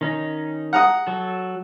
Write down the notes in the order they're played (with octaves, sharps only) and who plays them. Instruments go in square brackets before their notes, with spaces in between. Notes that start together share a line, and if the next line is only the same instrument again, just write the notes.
[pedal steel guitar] D#3 C#4 D#4
[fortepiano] F#5 A#5 D#6
[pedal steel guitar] F#3 A4